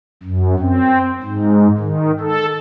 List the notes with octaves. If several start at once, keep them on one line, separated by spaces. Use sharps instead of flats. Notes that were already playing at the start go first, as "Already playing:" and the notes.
F#2
C4
G#2
D#3
A4